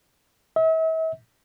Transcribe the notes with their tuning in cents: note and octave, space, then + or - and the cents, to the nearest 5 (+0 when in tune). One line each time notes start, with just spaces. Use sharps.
E5 -40